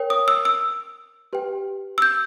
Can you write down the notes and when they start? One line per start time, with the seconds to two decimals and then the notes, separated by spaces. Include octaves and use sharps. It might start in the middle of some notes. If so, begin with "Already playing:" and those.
Already playing: A#4 C#5 G5
0.10 D#6
0.28 E6
0.45 E6
1.33 G4 B4 G5
1.98 E6
2.02 G6